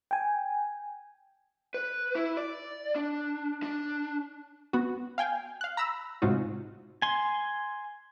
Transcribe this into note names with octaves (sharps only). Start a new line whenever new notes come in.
G5 G#5
B4
E4
D5
D4
D4
B3 F#4
F5 G5 G#5
F5 F#6
A#5 B5 E6
A2 C3 G#3 D#4 F4 F#4
G#5 C6